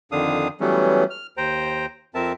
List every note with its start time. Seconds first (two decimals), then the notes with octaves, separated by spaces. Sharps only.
0.12 F2 D3 D#3 D4 F5 D#6
0.60 E3 F#3 G3 A3 B3 C#4
1.10 F6
1.37 D#2 C5 G5 A#5
2.15 F2 C4 A#4 E5 A5